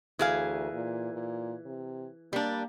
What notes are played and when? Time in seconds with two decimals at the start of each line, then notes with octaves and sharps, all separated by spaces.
0.19 D2 E3 G#4 F5
0.72 A#2
1.13 A#2
1.65 C3
2.33 G3 A#3 D4